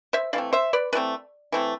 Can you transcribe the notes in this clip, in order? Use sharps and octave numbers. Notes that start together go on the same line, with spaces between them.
C5 E5
E3 A3 C4 D5 F5
C5 E5
B4 D5
E3 A3 C4 B4 D5
E3 A3 C4